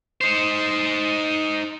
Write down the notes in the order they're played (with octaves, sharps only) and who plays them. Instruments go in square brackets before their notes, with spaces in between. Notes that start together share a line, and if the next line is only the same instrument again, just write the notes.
[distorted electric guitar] D#4 C5